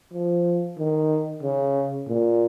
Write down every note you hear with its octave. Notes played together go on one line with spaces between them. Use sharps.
F3
D#3
C#3
A#2